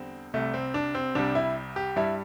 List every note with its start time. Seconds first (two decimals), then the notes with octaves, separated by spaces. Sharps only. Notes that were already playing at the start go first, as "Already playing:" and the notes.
Already playing: E2 D3 G3 C4
0.33 C2 C3 G3 A3
0.54 C4
0.74 D4
0.95 C4
1.15 C2 C3 G3 D4
1.35 E4
1.76 G4
1.96 G2 G3 E4